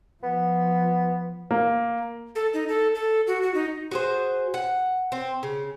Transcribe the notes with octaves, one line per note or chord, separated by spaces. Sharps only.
F3 B3
A#3
A4
D#4
A4
A4
F#4
F#4
D#4
F#4 G#4 C5
F#5
C4
C#3